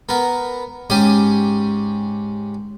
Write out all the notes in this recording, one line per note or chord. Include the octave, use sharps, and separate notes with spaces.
B3 A#4
G#2 C#4 G4 C#5 G#5 D#6